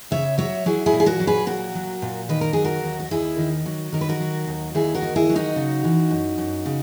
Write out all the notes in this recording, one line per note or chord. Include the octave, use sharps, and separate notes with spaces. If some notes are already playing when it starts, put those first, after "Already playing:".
C#3 C#5 E5
F#3 C#5 E5
F#3 E4 G#4
E4 G#4
A#2
G#4
F#4 A#4
F#3
G#4 B4
A#2 F#4 A#4
F#3
A#2
D#3 B4
A#4
F#3 G#4
F#4 A#4
D#2
A#4
D#2 E4 G#4
D#3
F#3
D#3 A#4
B4
F#4 A#4
F#3
D#2
D#2 E4 G#4
F#4 A#4
D#3
E4 G#4
F#3
D#4 F#4
C#3
E3
F#2
F#2
C#3